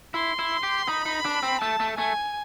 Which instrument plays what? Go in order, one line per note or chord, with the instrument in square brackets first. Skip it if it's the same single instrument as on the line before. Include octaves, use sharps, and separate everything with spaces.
[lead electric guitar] E4 [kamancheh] C6
[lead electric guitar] E4
G4
[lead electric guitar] D#4 [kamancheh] B5
[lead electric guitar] D#4
D4
C4
[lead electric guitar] A3 [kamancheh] A5
[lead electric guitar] A3
[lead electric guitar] A3 [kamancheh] G#5